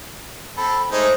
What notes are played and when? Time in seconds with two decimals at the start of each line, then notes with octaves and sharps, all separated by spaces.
0.57 C4 A4 B5
0.92 G#3 A3 D#4 C5